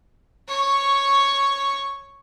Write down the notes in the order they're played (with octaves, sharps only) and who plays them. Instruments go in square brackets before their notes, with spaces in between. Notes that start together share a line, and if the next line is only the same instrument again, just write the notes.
[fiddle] C#5 C#6